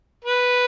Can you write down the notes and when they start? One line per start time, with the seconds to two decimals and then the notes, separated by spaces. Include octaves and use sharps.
0.24 B4